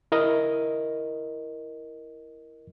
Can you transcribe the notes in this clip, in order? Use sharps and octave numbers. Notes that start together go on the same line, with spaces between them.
E4 A#4 D#5